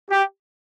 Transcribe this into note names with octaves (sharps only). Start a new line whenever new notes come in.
G4